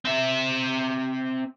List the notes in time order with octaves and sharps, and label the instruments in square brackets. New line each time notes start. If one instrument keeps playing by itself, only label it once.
[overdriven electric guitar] C4 E5